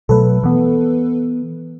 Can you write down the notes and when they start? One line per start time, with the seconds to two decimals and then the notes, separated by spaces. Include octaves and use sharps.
0.09 B2 F#3 A3 A4 B4
0.43 E3 B3